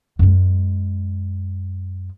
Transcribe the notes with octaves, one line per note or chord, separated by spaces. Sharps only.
F#2 G#3